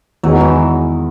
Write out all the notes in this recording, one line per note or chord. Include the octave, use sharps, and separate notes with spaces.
E2 D#3 F#3 G#3 D#4
E3